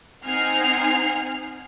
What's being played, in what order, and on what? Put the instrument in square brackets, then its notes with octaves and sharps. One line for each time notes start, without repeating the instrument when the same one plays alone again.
[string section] C4 D#4 F#5 G#5 F6 C7